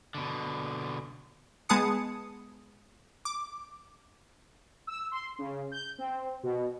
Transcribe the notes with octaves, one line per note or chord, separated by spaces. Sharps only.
B2 D3
G#3 B3 G#4 A5 D#6 C#7
D6
E6
C6
C#3
G6
C4
B2